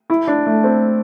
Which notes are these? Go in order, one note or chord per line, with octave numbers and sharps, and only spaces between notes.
E4
D4
A3
C4